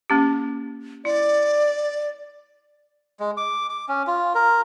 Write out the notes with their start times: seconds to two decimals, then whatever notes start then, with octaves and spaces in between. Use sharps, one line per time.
0.10 A#3 C#4 G4
1.05 E4 D5
3.20 G#3
3.37 D6
3.70 D6
3.88 C#4
4.07 F4
4.35 A#4